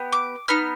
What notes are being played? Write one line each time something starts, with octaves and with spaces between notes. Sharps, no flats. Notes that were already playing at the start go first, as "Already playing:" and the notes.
Already playing: B3 G4
D6
B3 D#4 F6